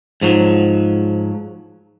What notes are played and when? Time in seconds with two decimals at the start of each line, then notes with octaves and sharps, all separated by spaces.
0.22 G#2 F3 F#3